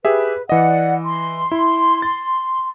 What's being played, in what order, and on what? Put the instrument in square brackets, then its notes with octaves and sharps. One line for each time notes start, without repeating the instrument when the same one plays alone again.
[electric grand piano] G4 G#4 E5 [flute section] B4
[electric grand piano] E3 D#5 [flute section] D5 F#5
[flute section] C6
[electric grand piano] E4
A6